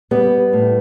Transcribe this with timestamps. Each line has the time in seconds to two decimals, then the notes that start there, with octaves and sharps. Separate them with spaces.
0.11 G3 B3
0.53 A2